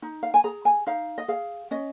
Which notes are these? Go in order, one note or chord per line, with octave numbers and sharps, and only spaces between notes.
D#4
F5
G#5
G#4 A#5
G#5
D#4 F5
D#5
G#4 F5
C#4 D#5